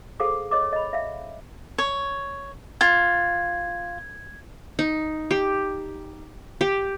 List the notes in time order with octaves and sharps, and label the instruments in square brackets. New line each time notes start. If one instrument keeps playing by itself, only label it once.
[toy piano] G#4 A4 C5 F5 F#5 D6
C#5 D#5 D6
D#5 B5
E5 F5
[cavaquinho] C#5
[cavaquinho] F4 [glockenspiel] G#6
[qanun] D#4
G4
G4